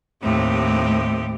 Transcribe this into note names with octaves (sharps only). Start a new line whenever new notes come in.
D#2 A2 C4 G4